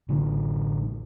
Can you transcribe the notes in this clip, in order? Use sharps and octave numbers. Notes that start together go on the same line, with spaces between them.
A1 D3